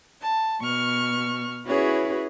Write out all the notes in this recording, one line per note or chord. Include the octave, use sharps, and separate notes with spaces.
A5
B2 C#6 F6
C#4 E4 F#4 G#4 B4 C#5